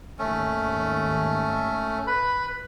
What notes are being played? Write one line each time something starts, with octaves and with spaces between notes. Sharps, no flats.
G#1 D#2 A3 C#4
B4 B5